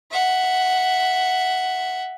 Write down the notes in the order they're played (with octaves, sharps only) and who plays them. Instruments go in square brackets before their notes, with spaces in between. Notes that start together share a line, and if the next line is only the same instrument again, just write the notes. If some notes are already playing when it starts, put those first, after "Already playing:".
[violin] E5 F#5